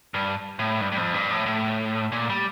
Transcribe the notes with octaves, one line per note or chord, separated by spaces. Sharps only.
G2
A2
G2
G2
F2
G2
A2
A2
A#2
G3